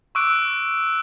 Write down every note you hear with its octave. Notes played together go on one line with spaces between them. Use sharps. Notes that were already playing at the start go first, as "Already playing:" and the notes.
C#6 D6 E6 F#6 D7